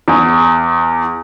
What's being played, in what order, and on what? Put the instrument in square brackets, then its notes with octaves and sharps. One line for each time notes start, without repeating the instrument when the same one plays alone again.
[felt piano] E2